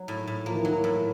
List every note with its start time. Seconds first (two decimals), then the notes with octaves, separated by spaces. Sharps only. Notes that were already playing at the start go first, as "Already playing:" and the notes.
Already playing: F#3
0.08 A2
0.27 A2
0.46 F3 A#3
0.55 E3
0.62 D#3 F#3
0.71 E3
0.84 A2